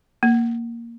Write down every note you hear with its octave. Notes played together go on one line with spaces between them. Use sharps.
A#3